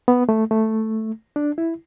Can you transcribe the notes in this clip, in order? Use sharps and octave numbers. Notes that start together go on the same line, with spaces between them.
B3
A3
A3
D4
E4